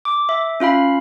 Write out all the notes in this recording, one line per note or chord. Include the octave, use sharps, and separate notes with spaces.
D6
E5
C#4 F4 F5 B5